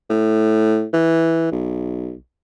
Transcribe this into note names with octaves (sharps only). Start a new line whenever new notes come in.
A2
E3
B1